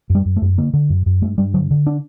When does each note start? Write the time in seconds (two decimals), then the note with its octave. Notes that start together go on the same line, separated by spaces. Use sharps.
0.10 F#2
0.15 G3
0.25 F#2
0.36 A3
0.42 F#2
0.58 D3 A#3
0.73 D3
0.90 F#2
1.06 F#2
1.22 G2 A3
1.38 G2 G3
1.54 D3 F#3
1.71 D3
1.86 D4